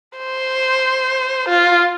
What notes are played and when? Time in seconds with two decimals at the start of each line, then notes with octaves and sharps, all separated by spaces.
0.18 C5
1.49 F4